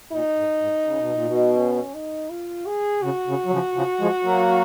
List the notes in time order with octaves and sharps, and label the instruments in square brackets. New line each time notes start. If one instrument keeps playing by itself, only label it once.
[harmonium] A#2 [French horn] D#4
[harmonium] G#2
G#2
C#3
B2
A#2
B2
[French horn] C#4
D#4
F4
G#4
[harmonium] C#3 [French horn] F#4
[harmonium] C#3
F#3
C#3 F3
C#3 F3
F3 G#3
F#3 A#3